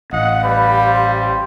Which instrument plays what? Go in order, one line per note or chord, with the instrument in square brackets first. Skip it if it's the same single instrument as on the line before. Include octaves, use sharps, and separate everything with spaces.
[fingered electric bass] A1 [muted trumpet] D#5 [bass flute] F5 [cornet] F#5
[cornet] G3 [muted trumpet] B4
[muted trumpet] C5